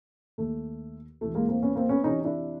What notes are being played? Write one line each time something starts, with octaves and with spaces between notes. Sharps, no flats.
D#2 D#3 A3
D2 C3 E3 A3
G#3 A#3
A#3 C4
B3 C#4
A#3 C4
B3 C#4
F2 C3 E3 C#4 D#4
D4 E4